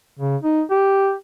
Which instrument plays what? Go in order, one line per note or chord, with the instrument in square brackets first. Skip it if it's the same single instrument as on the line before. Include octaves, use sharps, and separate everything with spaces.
[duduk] C#3
D#4
G4